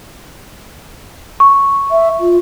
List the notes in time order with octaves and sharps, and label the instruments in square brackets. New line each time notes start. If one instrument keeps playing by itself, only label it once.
[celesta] C#6
[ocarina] E5
F4